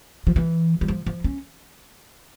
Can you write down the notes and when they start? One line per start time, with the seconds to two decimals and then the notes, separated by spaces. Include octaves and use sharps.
0.27 F3
0.36 E3
0.81 G3
0.88 F3
1.06 F3
1.24 C#4